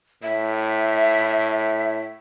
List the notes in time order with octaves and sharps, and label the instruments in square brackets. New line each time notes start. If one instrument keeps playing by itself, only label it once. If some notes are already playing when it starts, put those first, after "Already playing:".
[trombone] A2 [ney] E5